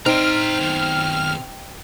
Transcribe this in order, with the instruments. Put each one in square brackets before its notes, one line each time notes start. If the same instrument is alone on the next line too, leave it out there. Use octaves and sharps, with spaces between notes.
[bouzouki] C4 [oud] D#4 [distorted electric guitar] C5 A#5 [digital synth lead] F6
[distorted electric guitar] B2 D#3